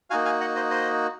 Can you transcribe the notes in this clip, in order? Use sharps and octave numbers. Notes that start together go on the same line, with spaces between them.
A#3 D#4 F#4 F5 G#5
F5 G#5
D#5 F#5
C5 D#5
C5 D#5